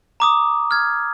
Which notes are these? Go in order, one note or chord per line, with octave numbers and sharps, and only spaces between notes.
A#5 D6 D#6
F6 G#6